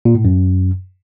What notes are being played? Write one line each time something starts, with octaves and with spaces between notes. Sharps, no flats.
A#2
A2
F#2